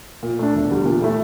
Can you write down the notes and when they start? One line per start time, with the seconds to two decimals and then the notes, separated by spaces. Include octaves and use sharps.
0.23 A#2
0.39 A3 D4
0.54 E1
0.70 E2 D3 G3
0.85 A#2
1.01 A3 E4 A4